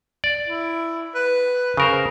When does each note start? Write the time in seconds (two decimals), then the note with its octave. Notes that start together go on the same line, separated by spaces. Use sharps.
0.24 D5
0.48 E4
1.15 B4
1.77 C#3 A#4 C5